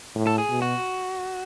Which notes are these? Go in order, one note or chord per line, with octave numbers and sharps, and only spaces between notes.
A2
A4
G#4
B2
F#4